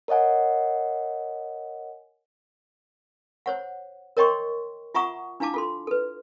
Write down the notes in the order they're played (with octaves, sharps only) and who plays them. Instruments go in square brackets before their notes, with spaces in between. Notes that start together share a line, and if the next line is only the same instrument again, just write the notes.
[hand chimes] A#4 C#5 D#5 F#5 G#5
[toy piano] C5 C#5 F#5
A#4 C#5 D#5 G5 C6 C#6
F4 E5 F#5 A#5 C#6 D#6
D4 E4 F5 A5 D6
F4 A4 C6
A4 B4